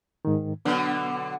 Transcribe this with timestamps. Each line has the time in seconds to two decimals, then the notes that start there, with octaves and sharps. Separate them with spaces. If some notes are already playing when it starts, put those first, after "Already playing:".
0.25 G#2 D#3
0.65 B2 D3 F#3 B3 D4